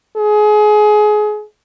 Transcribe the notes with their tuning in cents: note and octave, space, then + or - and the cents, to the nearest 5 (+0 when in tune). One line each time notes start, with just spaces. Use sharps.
G#4 +25